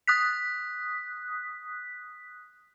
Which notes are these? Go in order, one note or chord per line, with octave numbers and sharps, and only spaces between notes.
D#6 F#6 B6